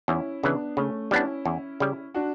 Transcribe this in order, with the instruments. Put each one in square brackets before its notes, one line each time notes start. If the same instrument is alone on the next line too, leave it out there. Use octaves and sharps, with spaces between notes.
[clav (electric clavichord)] E2 [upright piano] C#4 E4
[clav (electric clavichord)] C#3 E3 [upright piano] B3 D4
[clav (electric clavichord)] C#3 [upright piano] A3 C#4
[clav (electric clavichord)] G3 B3 D4 [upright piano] C#4 E4
[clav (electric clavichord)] E2
C#3 G3
[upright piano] D4 F#4